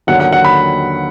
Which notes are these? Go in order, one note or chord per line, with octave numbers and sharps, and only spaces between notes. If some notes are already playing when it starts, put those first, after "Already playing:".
D#2 D3 F#3 F#5
F#5
F#5
B5